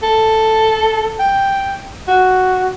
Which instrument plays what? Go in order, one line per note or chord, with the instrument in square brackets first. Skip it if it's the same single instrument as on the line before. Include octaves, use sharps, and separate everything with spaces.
[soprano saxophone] A4
G5
F#4